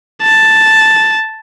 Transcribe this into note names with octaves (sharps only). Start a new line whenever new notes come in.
A5